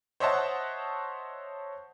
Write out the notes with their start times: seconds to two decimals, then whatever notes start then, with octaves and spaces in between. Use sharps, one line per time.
0.20 C5 C#5 D#5 E5 F#5 A5